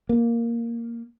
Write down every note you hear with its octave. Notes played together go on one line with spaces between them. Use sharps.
A#3